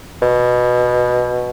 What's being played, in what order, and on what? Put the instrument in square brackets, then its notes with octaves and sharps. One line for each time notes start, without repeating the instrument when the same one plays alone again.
[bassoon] B2